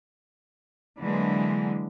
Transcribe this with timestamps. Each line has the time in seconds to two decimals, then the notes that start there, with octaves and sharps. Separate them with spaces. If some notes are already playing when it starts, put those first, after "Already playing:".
0.99 D3 E3 F#3 G#3 A#3